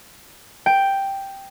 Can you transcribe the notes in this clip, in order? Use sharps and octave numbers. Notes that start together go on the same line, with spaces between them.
G5